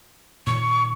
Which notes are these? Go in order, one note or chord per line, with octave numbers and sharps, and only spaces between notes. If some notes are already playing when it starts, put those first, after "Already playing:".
A#2 D#3 C#6